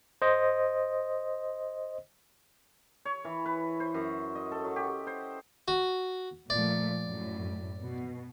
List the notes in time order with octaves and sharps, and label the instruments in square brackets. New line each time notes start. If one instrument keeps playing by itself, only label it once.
[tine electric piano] C5 D#5
[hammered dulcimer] C#5
E3
B4
C5
F#2
D#5
A4
F#3
G4
C5
[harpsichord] F#4
[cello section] A#2 F3 A3 [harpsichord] D5
[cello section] F#2 A2
B2